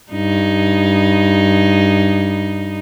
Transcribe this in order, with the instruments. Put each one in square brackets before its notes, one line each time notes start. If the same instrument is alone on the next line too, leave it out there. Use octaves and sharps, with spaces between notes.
[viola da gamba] G2 D#4